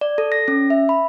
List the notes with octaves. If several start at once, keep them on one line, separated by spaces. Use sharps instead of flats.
D5
A4
A#6
C#4
E5
B5